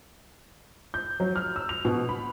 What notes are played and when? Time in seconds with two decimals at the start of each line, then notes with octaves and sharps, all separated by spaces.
0.94 G6
1.20 F#3
1.36 F6
1.56 E6
1.69 F7
1.85 B2
2.09 B5